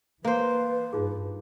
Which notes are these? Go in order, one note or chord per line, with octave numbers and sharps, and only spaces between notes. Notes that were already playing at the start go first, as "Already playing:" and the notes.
E3 A#3 B4 C5
G2 D#4 F4 G#4